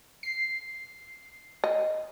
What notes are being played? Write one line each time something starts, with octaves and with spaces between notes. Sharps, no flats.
C7
D#5